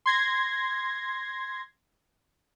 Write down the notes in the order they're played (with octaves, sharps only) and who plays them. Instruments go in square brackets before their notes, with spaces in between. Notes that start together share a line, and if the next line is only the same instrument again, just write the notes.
[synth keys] C6 G#6 A#6